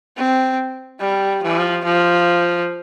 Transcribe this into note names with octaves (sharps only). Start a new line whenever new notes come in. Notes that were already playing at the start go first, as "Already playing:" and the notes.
C4
G3
F3
F3